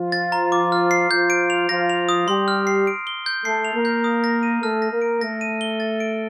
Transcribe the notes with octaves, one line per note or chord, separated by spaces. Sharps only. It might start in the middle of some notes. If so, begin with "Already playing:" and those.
Already playing: F3 F4
A6
A#5
D6
F6
C7
F3 F4 G6
D7
F7
F3 F4 A#6
F7
D#6
G3 G4 C6
F6
C7
D7
G7
G6
A3 A4 C7
F7
A#3 A#4
G6
D#6
A#6
D#7
A3 A4 F6
A#6
A#3 A#4
D7
A3 A4 A#6
D#7
G7
A6
D7